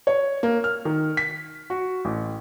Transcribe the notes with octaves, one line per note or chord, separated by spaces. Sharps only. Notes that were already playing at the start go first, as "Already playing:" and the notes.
C#5
A#3
F6
D#3
B6
F#4
A1